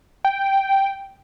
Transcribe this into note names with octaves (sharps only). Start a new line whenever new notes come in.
G5